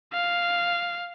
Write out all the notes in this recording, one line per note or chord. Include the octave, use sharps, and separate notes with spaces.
F5